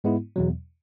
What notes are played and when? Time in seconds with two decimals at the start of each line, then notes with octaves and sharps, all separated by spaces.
0.04 G#2 G#3 B3 E4
0.36 E2 B2 F#3